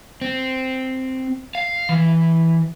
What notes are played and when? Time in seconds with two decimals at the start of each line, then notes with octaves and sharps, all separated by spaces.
0.21 C4
1.55 F5
1.89 E3